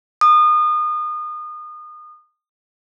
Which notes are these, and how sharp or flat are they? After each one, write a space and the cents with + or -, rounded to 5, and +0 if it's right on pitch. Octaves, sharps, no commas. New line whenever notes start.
D#6 -30